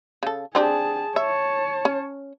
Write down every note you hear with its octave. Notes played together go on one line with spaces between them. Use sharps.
C#3 A4
C4 D4 G4 G#4 A5
C#5 E5 A5
C#4